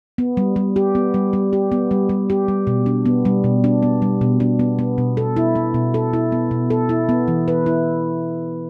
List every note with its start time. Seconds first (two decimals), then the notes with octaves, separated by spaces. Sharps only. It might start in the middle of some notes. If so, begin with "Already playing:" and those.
0.18 B3
0.37 G3
0.56 G3
0.76 G4
0.95 B3
1.14 G3
1.33 G3
1.53 G4
1.72 B3
1.91 G3
2.09 G3
2.30 G4
2.48 G3
2.67 B2
2.86 D4
3.06 B3
3.25 G3
3.44 B2
3.64 D4
3.83 B3
4.02 G3
4.21 B2
4.40 D4
4.59 B3
4.79 B3
4.98 B2
5.17 A4
5.36 E4
5.56 B3
5.74 B2
5.94 A4
6.13 E4
6.32 B3
6.51 B2
6.70 A4
6.89 E4
7.09 B3
7.28 E3
7.48 B4
7.66 E4